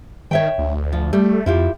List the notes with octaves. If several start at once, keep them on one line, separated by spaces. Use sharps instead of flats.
D#3 C#5 E5 G5
D2
F3
G3 A3
F2 E4 F4 G4